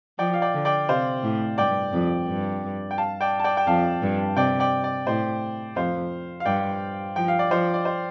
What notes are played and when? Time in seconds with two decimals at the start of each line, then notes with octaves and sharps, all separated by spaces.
0.18 F3 D5 G5
0.34 F5
0.42 D5 G5
0.54 D3
0.65 D5 G5
0.89 C3 C5 F5
1.23 A2
1.58 G2 D5 G5
1.93 F2
2.27 G2
2.91 G5
2.98 F5 A5
3.21 D5 G5
3.40 A5
3.44 D5 G5
3.57 G5
3.67 F2 F5 A5
4.02 G2
4.36 C3 D5 G5
4.60 D5 G5
4.84 D5
5.06 A2 C5
5.76 F2 C5 F5
6.40 F5
6.46 G2 D5 G5
7.16 F3 G5
7.28 F5
7.39 D5
7.50 F3 C5 F5
7.74 D5
7.85 C5